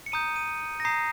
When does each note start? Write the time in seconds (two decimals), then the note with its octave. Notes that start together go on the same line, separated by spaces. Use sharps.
0.06 C#7
0.12 A#5 D#6 G6 D#7
0.36 D#7
0.80 A#6
0.84 A#5 D#6 G6 C7